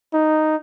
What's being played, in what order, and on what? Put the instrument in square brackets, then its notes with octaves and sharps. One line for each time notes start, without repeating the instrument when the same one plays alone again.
[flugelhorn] D#4